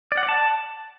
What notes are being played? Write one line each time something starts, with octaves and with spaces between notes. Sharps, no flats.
D5
F#5
D5
A5